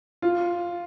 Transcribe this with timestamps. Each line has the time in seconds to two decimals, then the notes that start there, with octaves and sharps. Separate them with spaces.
0.22 F4